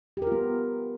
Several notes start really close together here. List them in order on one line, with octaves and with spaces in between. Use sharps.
G4 A#4 F4 B3